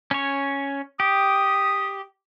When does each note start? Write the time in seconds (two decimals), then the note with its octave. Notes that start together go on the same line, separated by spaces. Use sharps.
0.11 C#4 C#5
1.00 G4 D#6